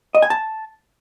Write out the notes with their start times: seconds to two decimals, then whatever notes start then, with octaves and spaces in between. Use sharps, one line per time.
0.15 D#5
0.22 G#5
0.30 A5